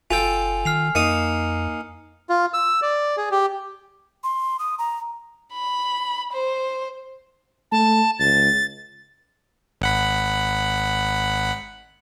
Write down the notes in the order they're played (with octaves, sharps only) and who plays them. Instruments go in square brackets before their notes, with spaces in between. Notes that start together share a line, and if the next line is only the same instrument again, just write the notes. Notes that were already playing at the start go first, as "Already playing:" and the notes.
[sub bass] F#1 [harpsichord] F4 A4 G5 [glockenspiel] G#5
[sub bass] D#3 [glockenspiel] F6 C7 F7
[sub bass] F2 [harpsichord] A#3 D#4 D#6 [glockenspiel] C#7
[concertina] F4
E6
D5
G#4
G4
[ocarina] C6
D#6
A#5
[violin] B5
C5
[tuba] A3 [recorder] A5
[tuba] C#2 [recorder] A6
[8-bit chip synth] G#1 F#5 B5